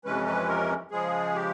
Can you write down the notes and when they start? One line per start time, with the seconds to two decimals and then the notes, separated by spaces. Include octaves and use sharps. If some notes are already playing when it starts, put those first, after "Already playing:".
0.05 F2 C3 E3 G#3 C#4 B4
0.26 B4
0.48 A#4
0.91 C#3 F3 G#3 G#4
1.35 G4